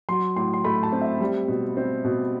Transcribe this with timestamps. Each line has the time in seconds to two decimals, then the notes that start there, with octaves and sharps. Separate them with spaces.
0.09 F#3 C6
0.36 A2 C6
0.53 C6
0.64 A3 B5
0.83 A5
0.93 C4
1.02 E5
1.21 G3
1.48 B2
1.77 C4
2.04 B2